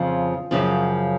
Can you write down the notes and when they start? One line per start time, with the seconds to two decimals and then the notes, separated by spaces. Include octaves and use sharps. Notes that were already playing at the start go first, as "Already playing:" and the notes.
Already playing: F2 C#3 F3 F4
0.51 F#2 C#3 F3